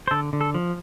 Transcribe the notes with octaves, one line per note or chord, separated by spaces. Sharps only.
C5
D3 A4
D3
A4
F3